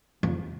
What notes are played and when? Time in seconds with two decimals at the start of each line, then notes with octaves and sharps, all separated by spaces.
0.23 F2